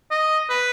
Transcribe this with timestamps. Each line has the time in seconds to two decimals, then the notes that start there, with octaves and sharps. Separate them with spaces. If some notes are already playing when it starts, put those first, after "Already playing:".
0.11 D#5
0.50 B4